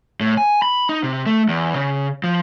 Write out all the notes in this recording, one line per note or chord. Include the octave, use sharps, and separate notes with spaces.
A2
G#5
B5
D#4
C3
A3
E2
C#3
F3